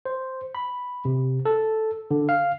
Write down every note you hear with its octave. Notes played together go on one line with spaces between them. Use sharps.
C5
B5
C3
A4
D3
F5